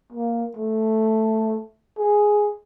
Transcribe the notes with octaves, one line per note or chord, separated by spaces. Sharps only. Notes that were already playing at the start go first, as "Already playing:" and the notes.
A#3
A3
G#4